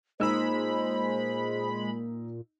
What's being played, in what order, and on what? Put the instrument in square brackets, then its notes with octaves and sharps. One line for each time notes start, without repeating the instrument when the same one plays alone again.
[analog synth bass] A#2 [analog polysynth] G#3 B5 [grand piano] D#4 E6 [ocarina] C5